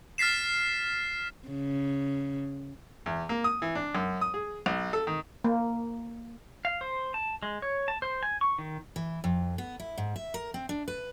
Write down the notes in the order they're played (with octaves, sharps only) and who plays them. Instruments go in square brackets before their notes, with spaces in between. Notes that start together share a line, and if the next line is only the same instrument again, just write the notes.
[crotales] F6 A6 B6 C7 E7
[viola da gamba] C#3
[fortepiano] E2
A#3
D#6
E3
D4
F#2
D#6
G#4
B1
A4
D#3
[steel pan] A#3
[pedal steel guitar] F5
C5
A5
G#3
C#5
A5
C5
G#5
C#6
D#3
[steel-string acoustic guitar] E3
F2
B3
E4
G#2
E5
A#4
C4
D4
B4